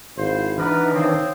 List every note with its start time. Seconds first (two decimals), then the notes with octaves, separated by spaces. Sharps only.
0.18 G#1 E4 C5 F5
0.58 E3 D4 D#4 B4 F#5 A#5 F6
0.94 D#3 C4 C#5 F5 D#6